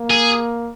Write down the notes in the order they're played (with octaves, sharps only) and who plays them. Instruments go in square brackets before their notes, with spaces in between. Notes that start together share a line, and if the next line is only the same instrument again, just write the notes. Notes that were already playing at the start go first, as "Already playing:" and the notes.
Already playing: [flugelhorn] A#3
[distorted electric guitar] G#4